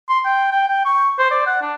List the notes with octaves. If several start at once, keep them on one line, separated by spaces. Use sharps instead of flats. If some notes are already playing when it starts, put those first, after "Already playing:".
C6
G5
G5
G5
C#6
C5
D5
F#5
D4